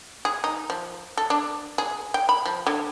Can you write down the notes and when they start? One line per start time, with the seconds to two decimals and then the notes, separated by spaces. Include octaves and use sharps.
0.25 G#4
0.44 D#4
0.70 F3
1.17 A4
1.30 D4
1.78 G#4
2.14 G5
2.29 B5
2.46 F3
2.67 D3